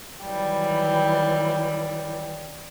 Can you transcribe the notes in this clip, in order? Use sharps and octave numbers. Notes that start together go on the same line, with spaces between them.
D#3 E3 F#3 G3